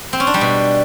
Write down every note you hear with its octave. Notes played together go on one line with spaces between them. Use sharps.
C4
C#4
D4
G3
B2